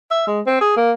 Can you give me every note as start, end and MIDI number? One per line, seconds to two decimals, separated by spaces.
0.11 0.22 76
0.27 0.40 56
0.46 0.61 60
0.61 0.74 68
0.77 0.92 58